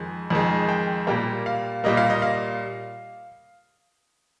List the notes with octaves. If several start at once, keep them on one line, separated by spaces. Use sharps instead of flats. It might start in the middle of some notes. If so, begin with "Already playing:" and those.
Already playing: F2 D#3 G#3
F2 D#3 G#3
G5
A#2 G3 A#3 G5
F5
A#2 G3 A#3 D#5
F5
D#5
F5